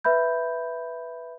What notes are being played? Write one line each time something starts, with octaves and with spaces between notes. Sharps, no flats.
B4 E5 B5 G6